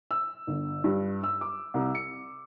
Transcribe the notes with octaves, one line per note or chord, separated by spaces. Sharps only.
E6
G1
G2
E6
D6
C2
C#7